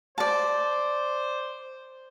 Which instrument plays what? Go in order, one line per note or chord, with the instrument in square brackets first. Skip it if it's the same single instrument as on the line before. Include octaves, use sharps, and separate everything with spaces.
[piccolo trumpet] C5 [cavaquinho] D5 A5